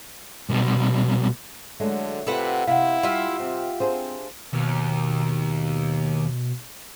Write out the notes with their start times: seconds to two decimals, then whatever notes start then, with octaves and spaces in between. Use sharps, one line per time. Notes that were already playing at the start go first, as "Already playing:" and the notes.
0.50 C2 B2
1.80 D3 F#3 G#3 A3
2.27 C3 F4 A4 B4 D5 F#5
2.67 C3 B3 E4 F5 F#5
3.03 G3 F4 G4 E5
3.40 C3 C4
3.80 C4 D4 G#4 C5
4.53 D#2 B2